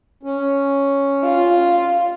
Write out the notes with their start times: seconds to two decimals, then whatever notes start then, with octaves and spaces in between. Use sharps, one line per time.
0.23 C#4
1.24 F4